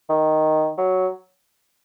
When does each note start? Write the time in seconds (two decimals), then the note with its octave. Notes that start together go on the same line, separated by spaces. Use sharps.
0.09 D#3
0.77 F#3